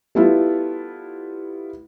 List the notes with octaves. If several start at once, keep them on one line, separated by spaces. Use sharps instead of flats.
G3 A3 B3 E4 F4